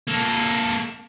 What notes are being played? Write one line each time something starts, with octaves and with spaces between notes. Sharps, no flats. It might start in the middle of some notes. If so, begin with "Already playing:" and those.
A#3 A4